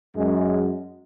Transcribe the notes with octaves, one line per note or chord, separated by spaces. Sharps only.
F#2 G#3